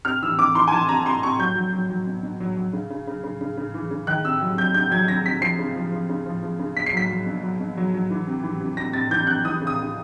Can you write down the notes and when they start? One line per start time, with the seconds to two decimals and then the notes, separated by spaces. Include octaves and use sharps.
0.05 C3 F6
0.22 E3 E6
0.38 E3 D6
0.55 E3 C6
0.68 G#5
0.72 E3 A5
0.89 C3 A#5
1.06 C3 C6
1.23 C3 C#6
1.39 F#3 G6
1.56 F#3
1.73 F#3
1.90 F#3
2.07 B2
2.23 B2
2.40 F#3
2.57 F#3
2.73 C#3
2.90 C#3
3.07 C#3
3.24 C#3
3.41 C#3
3.57 C#3
3.74 E3
3.91 C#3
4.07 D#3 F#6
4.25 C3 E6
4.41 F#3
4.58 F#3 G6
4.74 C3 G6
4.91 F#3 G#6
5.08 C3 A#6
5.25 C3 B6
5.41 F3 C7
5.59 C#3
5.76 F3
5.92 F3
6.09 C#3
6.26 F3
6.42 F3
6.59 C#3
6.76 B2 B6
6.86 C7
6.93 F#3 B6
7.09 F#3
7.26 B2
7.43 F#3
7.60 B2
7.77 F#3
7.94 F#3
8.10 E3
8.27 C3
8.44 E3
8.60 C3
8.77 C3 A#6
8.93 C3 A6
9.11 E3 G6
9.27 C3 F#6
9.45 E3 D#6
9.61 C#3
9.67 D#6
9.79 C#3